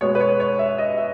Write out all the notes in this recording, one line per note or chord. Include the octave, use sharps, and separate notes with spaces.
B2 G#3 B3 C#5
B4
C#5
C#5
E5
D#5
E5